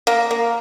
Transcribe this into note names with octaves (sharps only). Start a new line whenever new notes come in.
A#3
A#3